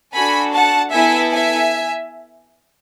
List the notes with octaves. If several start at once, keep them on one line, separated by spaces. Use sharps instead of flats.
D4 F#4 A4 G#5 B5
F#5 A5
B3 E4 A4 E5 G#5
E5 G#5